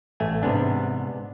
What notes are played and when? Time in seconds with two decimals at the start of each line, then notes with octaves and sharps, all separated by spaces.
0.20 A1 A3 G#5
0.43 G#2 C3 B3 D4